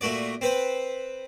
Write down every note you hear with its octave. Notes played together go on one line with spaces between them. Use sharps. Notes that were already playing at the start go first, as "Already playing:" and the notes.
A#2 A3 F#4 D5
C4 B4 C5